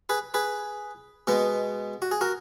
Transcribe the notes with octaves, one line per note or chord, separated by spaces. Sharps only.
G#4 B4
G#4 B4
B2 G#3 B3
F#4
G#4
F#4 A#4